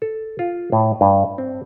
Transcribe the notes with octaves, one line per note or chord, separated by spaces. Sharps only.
A4
F4
A2
G2
C4